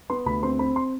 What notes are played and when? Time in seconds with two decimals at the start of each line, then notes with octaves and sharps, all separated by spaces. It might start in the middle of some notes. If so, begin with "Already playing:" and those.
0.10 B3 C6
0.26 D2 B5
0.43 C4 C6
0.59 C4 B5
0.76 C6